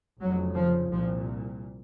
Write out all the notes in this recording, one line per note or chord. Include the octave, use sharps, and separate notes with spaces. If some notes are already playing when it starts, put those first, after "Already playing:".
F1 F2 C#3 F#3
F3
C2 A#2 F3